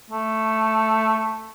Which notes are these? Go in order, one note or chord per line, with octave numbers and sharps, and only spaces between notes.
A3